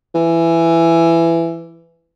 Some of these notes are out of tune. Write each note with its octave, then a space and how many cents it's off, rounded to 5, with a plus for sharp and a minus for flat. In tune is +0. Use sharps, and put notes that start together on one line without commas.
E3 +15